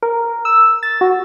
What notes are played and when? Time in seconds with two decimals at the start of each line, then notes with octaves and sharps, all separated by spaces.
0.03 A#4
0.45 E6
0.83 A6
1.01 F#4